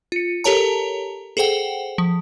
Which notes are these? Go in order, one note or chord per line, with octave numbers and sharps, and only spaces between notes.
F4 C#7
G4 A4 A#4 C#5 A5 A#5
G#4 A4 C5 F#5 G5
F3